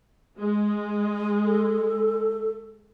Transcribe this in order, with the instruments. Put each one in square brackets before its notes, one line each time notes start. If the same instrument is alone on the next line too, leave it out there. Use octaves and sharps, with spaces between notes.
[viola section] G#3
[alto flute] A4